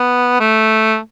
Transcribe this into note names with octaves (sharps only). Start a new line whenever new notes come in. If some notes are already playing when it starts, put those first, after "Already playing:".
Already playing: B3
A3